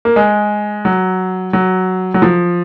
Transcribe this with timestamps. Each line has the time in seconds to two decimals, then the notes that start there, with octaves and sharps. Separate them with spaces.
0.05 A#3
0.16 G#3
0.85 F#3
1.53 F#3
2.14 F#3
2.22 F3